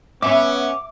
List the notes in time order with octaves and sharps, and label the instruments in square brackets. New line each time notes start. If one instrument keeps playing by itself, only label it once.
[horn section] B3 C#4 [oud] E5 [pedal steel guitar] D6